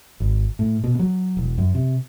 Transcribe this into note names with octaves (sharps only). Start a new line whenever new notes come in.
G#1
A2
B2
F#3
E1
F#2
C3